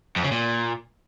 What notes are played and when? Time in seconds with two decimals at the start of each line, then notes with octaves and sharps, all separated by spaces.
0.16 F2
0.24 C#3
0.31 A#2